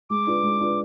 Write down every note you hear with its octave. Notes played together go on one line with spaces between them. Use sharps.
G#3 D6
D4 F4 B4
G#3
D4 F4 B4